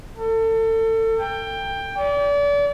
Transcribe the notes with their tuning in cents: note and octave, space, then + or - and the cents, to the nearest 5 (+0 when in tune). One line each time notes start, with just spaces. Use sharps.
A4 +30
G5 +15
D5 -35